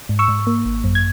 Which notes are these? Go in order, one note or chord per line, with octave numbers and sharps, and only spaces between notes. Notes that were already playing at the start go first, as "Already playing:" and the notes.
G#2
C#6 E6
G#2
A#3
G#1
F#2
G#6